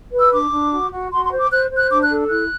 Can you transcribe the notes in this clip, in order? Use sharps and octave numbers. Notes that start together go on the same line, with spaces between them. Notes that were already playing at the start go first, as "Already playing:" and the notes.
B4
E6
D4 D6
D4
F#4
F#4
F#4 C6
C6
C5
D6
C5 F#6
C5
F#6
D4 D6
F#6
A4
E4 F#6